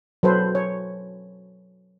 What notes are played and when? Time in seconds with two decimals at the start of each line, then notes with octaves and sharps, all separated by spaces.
0.23 F#3 A4 B4 C5
0.55 C#5